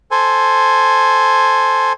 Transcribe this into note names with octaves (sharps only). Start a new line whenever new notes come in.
A4 C5 G#5